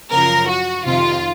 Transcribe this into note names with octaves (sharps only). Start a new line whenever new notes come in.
F#2 C#3 F3 A#4
F#4
F2 C3 D#3 F4